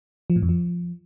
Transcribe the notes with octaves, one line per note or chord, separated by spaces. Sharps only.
F3
A2
F2
F3